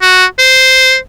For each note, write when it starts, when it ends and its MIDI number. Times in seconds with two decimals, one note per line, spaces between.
0.01 0.25 66
0.39 0.96 72